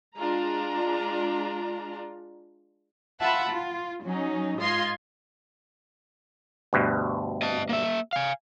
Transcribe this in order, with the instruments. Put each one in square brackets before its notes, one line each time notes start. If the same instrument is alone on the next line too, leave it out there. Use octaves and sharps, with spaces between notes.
[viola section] G#3 D4 F4 A#5
[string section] F4 E5 F#5 A5 B5
F4
F#3 C#4 D#4
G#2 F4 D#5 C6 G#6
[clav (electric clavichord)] D2 G2 B2
[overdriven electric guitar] D#5 A5
A#3 E5
F5 G#5